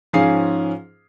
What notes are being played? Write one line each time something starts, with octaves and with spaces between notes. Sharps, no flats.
G#2 F3 C#4 G#4 F5 C7